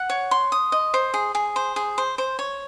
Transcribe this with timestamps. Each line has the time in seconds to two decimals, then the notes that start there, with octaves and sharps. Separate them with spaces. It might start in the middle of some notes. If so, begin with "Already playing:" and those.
Already playing: F#5
0.10 C#5
0.31 C6
0.52 D#6
0.72 D#5
0.94 C5
1.14 G#4
1.35 G#4
1.56 C5
1.76 G#4
1.98 C5
2.18 C5
2.39 C#5